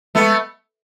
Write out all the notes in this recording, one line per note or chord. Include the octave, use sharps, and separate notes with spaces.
G#3 A3 B3